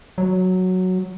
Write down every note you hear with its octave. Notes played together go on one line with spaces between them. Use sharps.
F#3